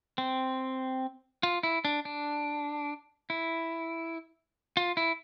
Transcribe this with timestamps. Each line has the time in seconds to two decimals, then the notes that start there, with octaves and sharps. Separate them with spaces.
0.18 C4
1.43 F4
1.63 E4
1.85 D4
2.05 D4
3.30 E4
4.77 F4
4.97 E4